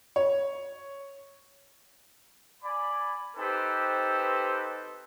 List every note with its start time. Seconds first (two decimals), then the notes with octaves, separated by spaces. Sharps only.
0.16 C#5
2.64 D5 G#5 B5
3.37 C4 D#4 G4 A4 B4 C5